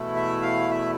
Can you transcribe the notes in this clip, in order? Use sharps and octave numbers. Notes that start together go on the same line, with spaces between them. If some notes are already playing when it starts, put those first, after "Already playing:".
Already playing: E2 B2 A3 E4
E5
F5
E5